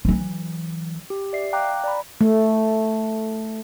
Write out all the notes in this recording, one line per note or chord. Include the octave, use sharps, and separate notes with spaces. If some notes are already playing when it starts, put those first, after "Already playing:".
E3 F#3
G4
D5 E5 C7
F5 G5 A#5 D6 F#6
D5 A#5 B5
A3